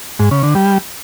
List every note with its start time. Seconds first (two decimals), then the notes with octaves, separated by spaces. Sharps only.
0.19 G#2
0.31 C#3
0.43 D3
0.55 G3